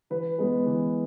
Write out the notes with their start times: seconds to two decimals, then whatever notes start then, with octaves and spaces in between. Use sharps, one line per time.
0.10 E3 B4
0.38 G#3 B3
0.66 E3